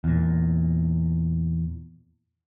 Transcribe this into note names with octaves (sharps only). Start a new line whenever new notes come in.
E2 A#2